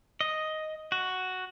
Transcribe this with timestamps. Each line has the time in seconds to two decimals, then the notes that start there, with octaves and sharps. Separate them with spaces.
0.21 D#5
0.92 F#4